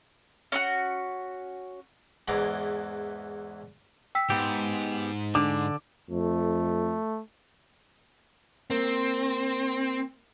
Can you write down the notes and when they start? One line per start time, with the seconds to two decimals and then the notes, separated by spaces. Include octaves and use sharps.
0.52 C#4 D#4 F#4
2.28 E2 G#2 E3 A#5 C6 D6
4.15 G5 E6 B6
4.30 G#2 B3 G4
5.35 D3 D4 D6
6.10 F2 A3
8.70 A#3 C4